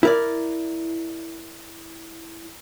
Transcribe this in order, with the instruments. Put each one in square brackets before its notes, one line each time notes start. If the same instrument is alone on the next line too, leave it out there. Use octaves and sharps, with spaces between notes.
[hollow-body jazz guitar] E4 A#4 D5